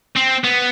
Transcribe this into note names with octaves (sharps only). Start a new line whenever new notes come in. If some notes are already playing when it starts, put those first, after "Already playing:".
C4
B3